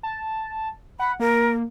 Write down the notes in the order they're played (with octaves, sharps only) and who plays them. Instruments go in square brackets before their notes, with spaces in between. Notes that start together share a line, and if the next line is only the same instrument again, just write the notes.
[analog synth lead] A5
[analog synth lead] F#5 [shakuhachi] B5
[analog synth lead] A#3 [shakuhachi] A#4